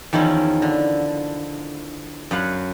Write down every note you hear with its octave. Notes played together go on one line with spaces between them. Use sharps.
E2 D#3 F3 C#4 E4
D3
F#2 B4 F5 F#5